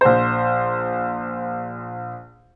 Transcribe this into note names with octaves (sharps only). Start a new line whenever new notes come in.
A#1 C5